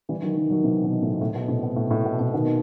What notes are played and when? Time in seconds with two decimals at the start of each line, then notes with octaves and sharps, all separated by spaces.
0.09 E3 G3
0.22 D#3 F#3
0.36 D#3 F#3
0.50 D#3 F#3
0.64 C3 E3
0.83 B2 D#3
1.02 A2 C3
1.21 A2 C3
1.35 B2
1.48 A2 C3
1.63 B2
1.76 A2
1.91 A2
2.05 B2
2.19 A2 C3
2.33 B2 D#3